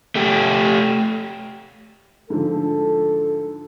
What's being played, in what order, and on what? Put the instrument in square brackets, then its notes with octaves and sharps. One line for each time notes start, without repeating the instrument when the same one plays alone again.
[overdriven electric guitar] A3 G4
[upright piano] G#2 D3 F3 [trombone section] A4